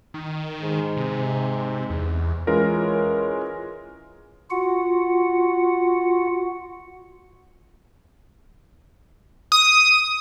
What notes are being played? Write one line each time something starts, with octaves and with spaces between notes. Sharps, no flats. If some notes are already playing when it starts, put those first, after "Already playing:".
D#3
G#2
C3
E2
E3 G#3 C#4 F4 A#4 C#5
F4 F#4 F#5
D#6